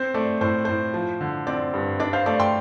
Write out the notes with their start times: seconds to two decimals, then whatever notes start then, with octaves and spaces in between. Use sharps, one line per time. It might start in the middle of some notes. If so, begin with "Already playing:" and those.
Already playing: C4 C5
0.14 A3 D5
0.41 A2 C5
0.65 A2 C5
0.94 F3
1.21 D3
1.47 C4 D5
1.74 G2
2.00 D4 D5
2.13 C5 F5
2.26 A3 D5
2.39 G5 C6